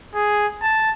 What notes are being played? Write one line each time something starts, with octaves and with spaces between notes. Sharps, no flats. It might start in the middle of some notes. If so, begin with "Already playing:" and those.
G#4
A5